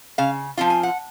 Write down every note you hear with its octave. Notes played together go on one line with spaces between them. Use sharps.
C#3 F5
F3 C4 F4
G#5
F#5